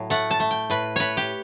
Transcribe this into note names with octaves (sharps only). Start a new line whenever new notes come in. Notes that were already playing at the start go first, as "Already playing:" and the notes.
Already playing: A2 F#3
A3 F#5
A5
A3
G5
A2 B4
A2 B4 C#5
G4